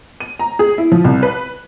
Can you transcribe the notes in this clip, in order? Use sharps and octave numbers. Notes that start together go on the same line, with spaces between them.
D#7
A#5
G#4
E4
F3
C2
B4